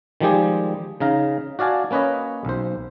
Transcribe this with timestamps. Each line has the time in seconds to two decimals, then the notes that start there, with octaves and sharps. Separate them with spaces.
0.20 D#3 F3 G3 G#3 G4 G#4
1.00 C#3 D#4 F5 A#5
1.59 F#4 D5 F5 G#5 A5
1.91 A#3 C#4 B4 C#5 D#5
2.45 B1 C5